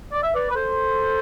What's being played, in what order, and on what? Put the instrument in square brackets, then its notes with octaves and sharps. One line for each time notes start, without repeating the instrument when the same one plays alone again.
[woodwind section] D5
E5
B4 D5
B4
A4 C5